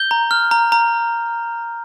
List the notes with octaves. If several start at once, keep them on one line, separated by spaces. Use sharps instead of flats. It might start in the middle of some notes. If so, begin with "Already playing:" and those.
Already playing: G6 G7
A#5
F6
A#5
A#5